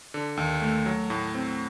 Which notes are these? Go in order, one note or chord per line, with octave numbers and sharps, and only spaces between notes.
D3
D#2
A3
F#3
A2
C4